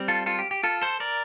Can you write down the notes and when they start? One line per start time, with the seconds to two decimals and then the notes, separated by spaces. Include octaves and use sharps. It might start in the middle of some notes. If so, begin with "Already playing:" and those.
Already playing: G3 C4
0.08 F4 A4
0.26 F4 A4
0.39 G4
0.51 G4
0.63 F4 A4
0.82 A4 C5
1.00 A#4 D5